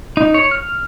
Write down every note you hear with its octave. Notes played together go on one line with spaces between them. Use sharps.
D#4
C#5
F6